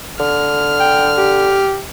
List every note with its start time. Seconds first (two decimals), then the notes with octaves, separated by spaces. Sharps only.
0.20 D3 F6
0.80 G5
1.17 G4